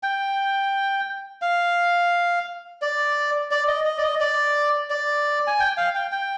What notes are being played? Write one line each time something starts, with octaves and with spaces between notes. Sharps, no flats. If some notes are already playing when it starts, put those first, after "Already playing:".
G5
F5
D5
D5
D#5
D#5
D5
D#5
D5
D5
G#5
G5
F5
G5
G5